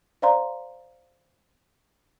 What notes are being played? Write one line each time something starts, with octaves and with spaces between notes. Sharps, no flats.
C5 D5 F5 A#5 C6